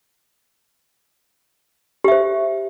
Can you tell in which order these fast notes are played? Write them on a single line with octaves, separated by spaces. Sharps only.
G4 E5 C5